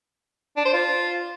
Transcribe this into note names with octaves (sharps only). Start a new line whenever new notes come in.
D4
C5
F4